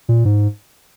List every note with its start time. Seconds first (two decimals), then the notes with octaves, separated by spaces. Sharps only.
0.09 A#2
0.25 G#2